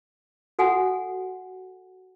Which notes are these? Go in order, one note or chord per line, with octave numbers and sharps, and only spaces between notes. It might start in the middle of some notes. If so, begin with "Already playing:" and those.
F#4 A4 F#5 G#5